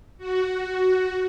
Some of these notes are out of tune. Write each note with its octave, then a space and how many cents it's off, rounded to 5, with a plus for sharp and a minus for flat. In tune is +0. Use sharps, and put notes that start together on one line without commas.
F#4 +5